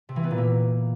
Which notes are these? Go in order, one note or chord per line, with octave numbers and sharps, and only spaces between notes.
C3
E3
B3
A#2
A#3